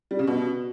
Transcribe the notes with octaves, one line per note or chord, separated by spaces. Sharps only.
G3
C#3
B2